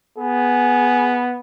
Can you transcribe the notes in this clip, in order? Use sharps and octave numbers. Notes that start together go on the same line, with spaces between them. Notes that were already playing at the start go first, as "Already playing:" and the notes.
B3 G#4